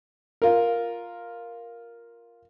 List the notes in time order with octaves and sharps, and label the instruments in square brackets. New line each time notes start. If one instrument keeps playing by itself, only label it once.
[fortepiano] F4 A#4